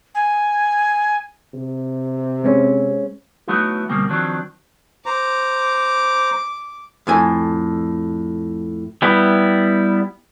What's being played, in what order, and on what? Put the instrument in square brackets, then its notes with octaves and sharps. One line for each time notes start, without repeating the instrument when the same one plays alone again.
[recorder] G#5
[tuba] C3
[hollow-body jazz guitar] G#3 C4 C#4
[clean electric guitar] F#3 A3 B3 D#4 E4 F#4
D2 B2 G3 A#3 C4
D#3 F3 F#3 C4 D4
[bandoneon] C5 A#5 [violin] D6
[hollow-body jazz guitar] F2 A2 G#5
[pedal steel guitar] G3 B3 E4